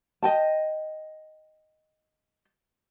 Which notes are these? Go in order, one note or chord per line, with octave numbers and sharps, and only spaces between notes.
D#5 G5 A5